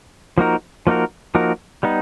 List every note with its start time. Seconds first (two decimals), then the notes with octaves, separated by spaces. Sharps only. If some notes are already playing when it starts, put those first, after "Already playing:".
0.38 F3 A#3 D#4 F#4 A#4
0.87 F3 A#3 D#4 F#4 A#4
1.35 F3 A#3 D#4 F#4 A#4
1.83 G3 B3 D#4